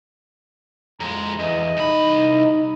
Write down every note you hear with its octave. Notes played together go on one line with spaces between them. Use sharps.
F2 G#3 A#5
E2 D#5
C2 D#4 B5